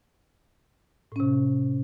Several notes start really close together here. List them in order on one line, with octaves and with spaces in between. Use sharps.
A2 C#4 C3